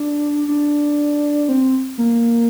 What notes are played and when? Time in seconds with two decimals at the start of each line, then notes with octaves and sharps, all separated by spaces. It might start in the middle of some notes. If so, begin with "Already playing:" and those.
Already playing: D4
0.48 D4
1.49 C4
1.98 A#3